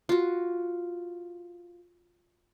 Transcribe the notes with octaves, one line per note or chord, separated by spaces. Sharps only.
F4 F#4